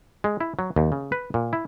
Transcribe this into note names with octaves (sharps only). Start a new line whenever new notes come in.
G#3
E4
F#3
D#2
C#3
B4
A#2
E4